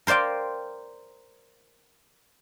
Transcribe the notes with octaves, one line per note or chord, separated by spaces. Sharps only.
A#4 C5 D5 F5 G5